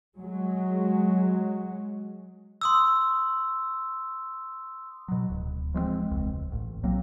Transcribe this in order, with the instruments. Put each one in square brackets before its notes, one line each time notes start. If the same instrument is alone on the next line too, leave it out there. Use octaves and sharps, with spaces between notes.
[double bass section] F#3 G#3
[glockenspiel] C6 D#6 E6
[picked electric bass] B2 F#3
D1
F3 G#3 A3 C4
E1 C#2
A1
B1 F#3 A#3 C4